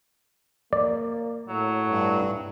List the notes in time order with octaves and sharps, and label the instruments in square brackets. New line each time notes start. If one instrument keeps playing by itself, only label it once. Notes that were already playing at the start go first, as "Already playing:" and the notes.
[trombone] A#3 [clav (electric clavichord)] D5
[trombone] A2 [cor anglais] F#3
[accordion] G2